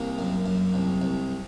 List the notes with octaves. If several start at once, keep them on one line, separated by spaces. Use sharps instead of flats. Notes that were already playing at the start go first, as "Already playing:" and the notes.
Already playing: C2 A#3 A#4
F#2
F#2
C2
C2